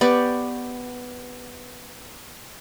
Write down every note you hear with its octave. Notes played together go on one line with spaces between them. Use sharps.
B3 G4 D5 C#6